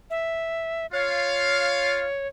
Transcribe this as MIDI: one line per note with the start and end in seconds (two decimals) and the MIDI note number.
0.10 0.86 76
0.93 2.06 65
0.93 2.27 73
0.93 2.06 77